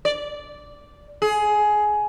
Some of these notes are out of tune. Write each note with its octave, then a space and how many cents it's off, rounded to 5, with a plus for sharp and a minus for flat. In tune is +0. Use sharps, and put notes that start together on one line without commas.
D5 -10
G#4 +15